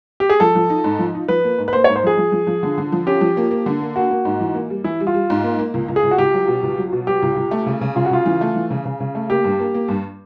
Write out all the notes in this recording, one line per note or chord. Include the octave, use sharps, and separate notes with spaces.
G4
G#4
F3 A4
F3
D#4
G#2
F3
D#4
F3 B4
A#3
G#2
B4
A#3 C5
C#5
G#2
C5
F3 G#4
F3
F3
F3
D3
D3
F3
C#4 G4
F3
A#3
A#3
D3
A#3
A#3 F#4
A#3
G#2
E3
A#3
G3
E3 E4
G3
F4
G3
G#2
A#3
A#3
C#2
C#2
G#4
C#2
F#4
C#2 G4
F#3
B2
C#2
F#3
B2
F#3 G4
C#2
C#2
A3
C#3
C#3
C#3 F4
F#4
C#3 F4
E3
A3
E3
C#3
C#3
C#3
A3
A#3 G4
G2
A#3
A#3
G2